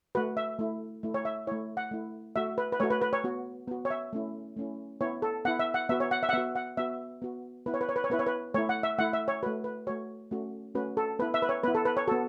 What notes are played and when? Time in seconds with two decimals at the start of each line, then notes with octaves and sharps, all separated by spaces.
0.15 A3 F#4 B4
0.37 E5
0.59 A3 E4
1.03 A3 E4
1.14 C#5
1.25 E5
1.47 A3 E4 C#5
1.77 F#5
1.91 A3 E4
2.36 A3 F#4 E5
2.58 B4
2.72 B4
2.80 A3 F#4 C#5
2.90 B4
3.02 B4
3.13 C#5
3.24 B3 F#4
3.68 B3 F#4
3.85 C#5
3.90 E5
4.13 A3 C#4 E4
4.57 A3 C#4 E4
5.01 B3 E4 C#5
5.22 A4
5.45 B3 E4 F#5
5.59 E5
5.74 F#5
5.89 B3 F#4 E5
6.00 C#5
6.11 F#5
6.23 E5
6.29 F#5
6.33 B3 F#4 E5
6.55 F#5
6.77 B3 F#4 E5
7.22 B3 F#4
7.66 B3 E4 B4
7.74 C#5
7.81 B4
7.89 C#5
7.96 B4
8.04 C#5
8.10 B3 E4 B4
8.19 C#5
8.27 B4
8.54 A3 E4 C#5
8.69 F#5
8.83 E5
8.98 A3 E4 F#5
9.13 E5
9.28 C#5
9.43 A3 F#4 B4
9.64 B4
9.87 A3 F#4 C#5
10.31 A3 C#4 F#4
10.75 A3 C#4 F#4 B4
10.97 A4
11.19 B3 E4 B4
11.34 E5
11.42 B4
11.49 C#5
11.64 B3 E4 B4
11.75 A4
11.85 B4
11.97 C#5
12.08 B3 F#4 A4